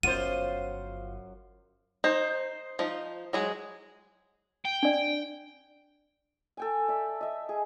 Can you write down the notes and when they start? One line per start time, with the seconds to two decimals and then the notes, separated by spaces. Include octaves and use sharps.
0.03 G1 F#2 F4 C5 F#5 D#7
2.04 D#4 C5
2.79 F3 D#4
3.33 F#3 G#3 G#4
4.65 G5
4.83 D4 D5
6.57 A4 G5 G#5
6.88 D5 E5
7.21 D#5 E5
7.49 G#4